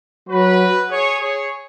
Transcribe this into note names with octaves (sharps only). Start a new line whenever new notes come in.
F#3 F#4 B4
G#4 C#5
G#4 C#5